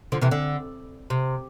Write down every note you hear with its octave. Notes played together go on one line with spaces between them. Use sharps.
D3 F3
C3 E3
D3
C3